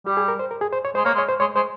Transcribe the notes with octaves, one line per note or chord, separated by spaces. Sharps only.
G3 G4
G#4
A#4
C5
A#4
G#4
C5
C#5
G#3 C5
A#3 C#5
G#3
C#5
C5
G#3 C#5
G#3 C5